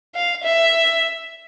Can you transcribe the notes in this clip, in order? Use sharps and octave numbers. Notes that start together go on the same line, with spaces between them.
F5
E5